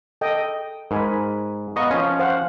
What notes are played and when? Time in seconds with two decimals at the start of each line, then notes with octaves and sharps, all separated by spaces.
0.21 A4 D#5 G5
0.91 G#2 A#4 G#5 B5
1.76 B3 D#5 F5 A#5 C#6
1.91 F3 C#4 C6
2.19 C5 F5 F#5